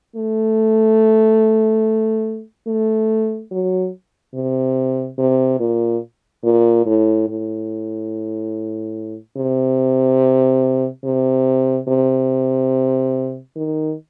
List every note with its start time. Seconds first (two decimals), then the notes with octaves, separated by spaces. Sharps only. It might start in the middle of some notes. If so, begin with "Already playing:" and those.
0.16 A3
2.67 A3
3.51 F#3
4.34 C3
5.18 C3
5.60 A#2
6.44 A#2
6.86 A2
7.28 A2
9.37 C3
11.04 C3
11.88 C3
13.56 D#3